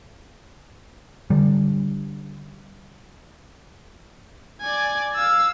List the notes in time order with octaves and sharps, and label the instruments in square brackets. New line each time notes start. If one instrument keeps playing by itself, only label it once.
[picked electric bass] D3 G3
[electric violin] D5 G#5
F5 E6